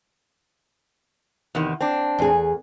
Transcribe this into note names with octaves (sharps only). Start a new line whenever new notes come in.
E2 C3 D#3
C4 D4
E2 G#4